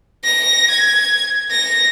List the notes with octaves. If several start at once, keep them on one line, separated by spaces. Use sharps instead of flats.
A#6
G#6
A#6